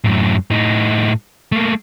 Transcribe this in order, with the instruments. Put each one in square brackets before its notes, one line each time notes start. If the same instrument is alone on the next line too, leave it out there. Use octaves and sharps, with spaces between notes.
[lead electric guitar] F#2 A2
A2 D#4
A3 A#3